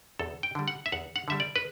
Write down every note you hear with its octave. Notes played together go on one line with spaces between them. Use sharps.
E2 A4
G5
D3 G3
F#5
E5
E2 F#5
F#5
D3 G3 E5
D5
B4